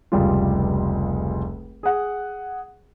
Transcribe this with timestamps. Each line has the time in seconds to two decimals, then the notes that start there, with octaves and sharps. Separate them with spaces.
0.12 F1 C#2 G3 G#3 F4
1.83 G#4 F#5